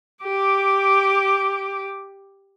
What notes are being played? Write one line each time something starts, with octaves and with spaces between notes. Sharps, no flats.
G4 D6